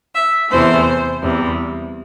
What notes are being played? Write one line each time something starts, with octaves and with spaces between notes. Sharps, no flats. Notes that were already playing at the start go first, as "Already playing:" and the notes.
E5
E2 C3 E3 A3 C5
E2 C3 G3